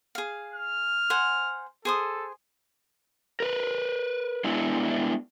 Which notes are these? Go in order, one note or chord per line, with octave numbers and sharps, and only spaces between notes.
G#4 F5
F6
C5 F#5 G#5
G#4 A4 C5 D#6
A#4 B4
G#3 B3 D4 E4